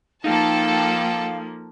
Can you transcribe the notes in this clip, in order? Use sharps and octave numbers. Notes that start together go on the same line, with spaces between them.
F3 A#3 D#4 A4 F5 G5 A5